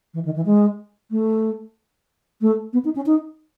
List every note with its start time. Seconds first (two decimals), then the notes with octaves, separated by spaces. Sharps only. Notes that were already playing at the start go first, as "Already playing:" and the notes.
0.14 E3
0.25 D#3
0.36 E3
0.46 G#3
1.11 A3
2.41 A3
2.73 B3
2.85 D#4
2.96 C#4
3.06 D#4